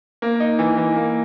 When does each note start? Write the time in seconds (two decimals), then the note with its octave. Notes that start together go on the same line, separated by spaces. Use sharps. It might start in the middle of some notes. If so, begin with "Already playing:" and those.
0.22 A#3
0.40 D#4
0.59 E3
0.78 E3
0.96 A#3